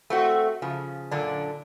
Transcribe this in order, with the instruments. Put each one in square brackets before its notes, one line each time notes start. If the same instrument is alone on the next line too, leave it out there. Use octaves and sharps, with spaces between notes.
[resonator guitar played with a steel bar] A3 C4 F#4
C#3 F3
F#2 A#2 D3 D4